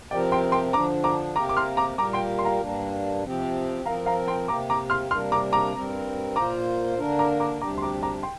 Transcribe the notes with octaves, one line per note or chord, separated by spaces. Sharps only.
C3 F3 C4 G4 A#4 D5 G5
G5 C6
G5 C6
D3 F3 D4 A#5 D6
A#5 D6
C3 A#3 G4 A#4 A#5 D6
D6
C6 F6
A#5 D6
A#2 G3 A#3 G4 A#4 A#5 D6
G5 C6
C6
F5 A#5
G2 G3 A#3 D4
C3 F3 C4 G4
F3 C4 A#4 F5 A#5
F5 A#5
G5 C6
C3 A#3 G4 A#5 D6
A#5 D6
C6 F6
C3 G3 A#3 D4 A#4 C6 F6
A#5 D6
A#5 D6
G2 G3 C4 A#4
A#2 A#3 F4 C5 A#5 D6
D3 A#3 D4 A#4
A#5 D6
A#5 D6
D2 C3 G3 D4 G4 A#5 D6
C6
A#5 D6
A#5 D6
G5 C6